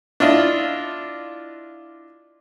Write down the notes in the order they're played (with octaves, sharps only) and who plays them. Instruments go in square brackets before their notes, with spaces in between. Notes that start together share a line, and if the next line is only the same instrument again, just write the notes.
[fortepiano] D4 E4 F4 D#5